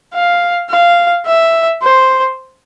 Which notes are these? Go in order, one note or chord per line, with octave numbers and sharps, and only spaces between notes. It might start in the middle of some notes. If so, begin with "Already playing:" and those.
F5
F5
E5
C5